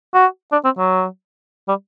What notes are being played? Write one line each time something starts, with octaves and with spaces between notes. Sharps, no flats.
F#4
D4
C4
F#3
G3